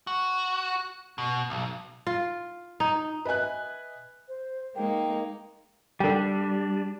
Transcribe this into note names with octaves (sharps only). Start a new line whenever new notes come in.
F#4
B2
B1
F4
D#4
B4 D#5 E5 G#5 F#6
C5
G#3 A#3 D#4 G5
G3 D4 A4 G5